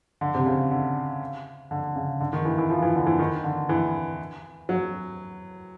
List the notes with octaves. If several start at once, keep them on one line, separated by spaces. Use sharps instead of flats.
D3
C3
C#3
D3
D3
C#3
D3
D#3
E3
E3
F3
E3
D3
E3
D#3
D3
E3
F#3